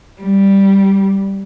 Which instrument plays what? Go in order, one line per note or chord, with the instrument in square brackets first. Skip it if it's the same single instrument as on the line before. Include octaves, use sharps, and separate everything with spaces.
[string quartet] G3